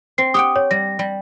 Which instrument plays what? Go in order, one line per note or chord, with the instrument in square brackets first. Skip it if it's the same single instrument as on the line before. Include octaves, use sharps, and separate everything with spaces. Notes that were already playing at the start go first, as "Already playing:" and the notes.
[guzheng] C4 [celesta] C7
[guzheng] G4 F#5 G5 [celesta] D#6
[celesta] C#5
[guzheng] G3 [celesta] A#6
[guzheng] G3